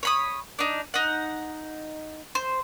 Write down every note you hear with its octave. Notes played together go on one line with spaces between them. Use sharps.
C#5 B5 D#6
D4 D#4
D#4 F#5
C5